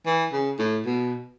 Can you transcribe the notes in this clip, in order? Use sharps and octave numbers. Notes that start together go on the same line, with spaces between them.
E3
C#3
A2
B2